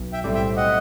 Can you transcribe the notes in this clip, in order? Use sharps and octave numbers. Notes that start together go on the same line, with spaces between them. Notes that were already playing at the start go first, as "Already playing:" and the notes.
Already playing: B1
E5 G5
A2 G3 C4
E5 G5
D#5 F#5